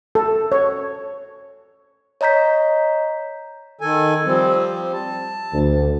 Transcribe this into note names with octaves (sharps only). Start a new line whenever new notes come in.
A4
C#5
C#5 D#5 A#5 G6 B6
D#3 A4 G#5
F3 G3 C4
A5
D2